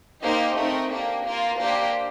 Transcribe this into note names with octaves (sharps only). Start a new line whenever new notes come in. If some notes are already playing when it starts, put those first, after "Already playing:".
A#3 D#4 G4 C5 D#5
A3 C4 D#4 A#4
A#3 D4 G4
A#3 F4 A#4
A#3 D4 G4 C5